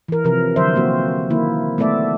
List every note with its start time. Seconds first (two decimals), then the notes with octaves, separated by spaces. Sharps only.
0.08 E3 A#4
0.24 C3 F3 A#4
0.56 D3 E3 F#3 C5 E5
0.76 A#3 C4 F#4
1.30 D#3 A#3 E4
1.78 A3 B3 A4 D5 E5